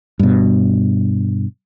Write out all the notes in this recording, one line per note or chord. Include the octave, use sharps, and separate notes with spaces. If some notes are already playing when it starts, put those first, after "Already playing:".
G2 B2